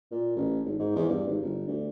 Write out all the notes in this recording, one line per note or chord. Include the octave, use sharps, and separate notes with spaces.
A#2
A1
G#1
G#2
E2
G2
G#1
G1
D2